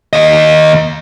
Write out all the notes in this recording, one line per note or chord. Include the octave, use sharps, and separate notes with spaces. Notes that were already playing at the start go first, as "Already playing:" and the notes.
D#2 D#5